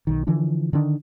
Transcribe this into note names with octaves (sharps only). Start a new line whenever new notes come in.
B1 D#3
D3 E3 F3 D4
D3 D#3 D4